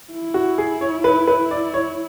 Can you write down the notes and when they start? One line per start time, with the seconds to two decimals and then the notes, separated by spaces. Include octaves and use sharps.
0.12 E4
0.34 F#4
0.58 G#4
0.81 C#5
1.04 B4
1.27 B4
1.51 D5
1.74 C#5